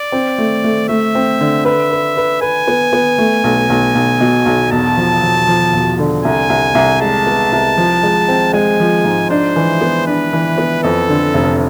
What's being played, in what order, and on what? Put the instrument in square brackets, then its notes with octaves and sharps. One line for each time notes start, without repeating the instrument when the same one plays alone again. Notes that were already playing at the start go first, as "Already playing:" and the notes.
Already playing: [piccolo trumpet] D5
[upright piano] C4
A3
A3
[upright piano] A3 [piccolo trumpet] E5
[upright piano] C4
D3
[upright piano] B4 [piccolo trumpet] E5
[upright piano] B4
B4
[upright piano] B4 [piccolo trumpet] G#5
[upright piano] B3
B3
A3
B1
B1
B1
B2
B1
[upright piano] E1 [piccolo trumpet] A5
[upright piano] F3
F3
F3
E1
D3
[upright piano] C2 [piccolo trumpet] G#5
[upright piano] C2
C2
[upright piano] G#3 [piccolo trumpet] A5
[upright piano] B3
C2
F3
G#3
C4
[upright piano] G#3 [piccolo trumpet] G#5
[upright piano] F3
G#2
[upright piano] D4 [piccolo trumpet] C5
[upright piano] E3
B3
[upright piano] D4 [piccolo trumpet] B4
[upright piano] E3
B3
[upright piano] F2 [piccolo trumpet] A4
[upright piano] D3
F1